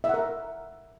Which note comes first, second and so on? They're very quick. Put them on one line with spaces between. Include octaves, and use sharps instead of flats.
E5 F#5 A#4